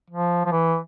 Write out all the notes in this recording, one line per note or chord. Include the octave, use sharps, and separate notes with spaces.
F3
F3
E3